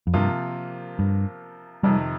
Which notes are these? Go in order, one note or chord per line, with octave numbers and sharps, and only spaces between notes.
F2
G2 C3 F3 A#3 F4
G2
F2 C3 D#3 G3